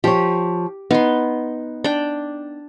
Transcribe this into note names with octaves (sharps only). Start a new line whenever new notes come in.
F3 G4 C#5
B3 D#4 C6
D4 G5